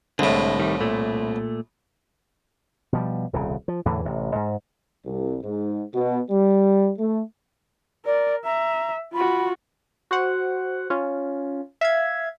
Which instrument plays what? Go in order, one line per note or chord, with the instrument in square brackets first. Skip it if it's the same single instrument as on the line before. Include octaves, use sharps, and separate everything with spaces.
[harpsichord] C2 A2 [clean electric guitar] D3 G#3
[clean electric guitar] D#3 G3
A#2 A3
[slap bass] B2 F3 G3
D#1 C2 C#3
F3
E2 A2 D3 E3
A1 C3
G#2
[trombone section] C2
G#2
B2
G3
A3
[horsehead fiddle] A#4 [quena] D5
[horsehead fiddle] E5 [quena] A#5
[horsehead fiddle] F4 F#4 [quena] B5
[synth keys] F#4 C5 F#5
C#4 F4
E5 F5 G#6